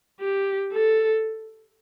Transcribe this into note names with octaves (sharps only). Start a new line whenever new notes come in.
G4
A4